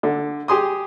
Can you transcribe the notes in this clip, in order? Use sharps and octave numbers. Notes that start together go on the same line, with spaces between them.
D3
G4 G#4 C6 D#6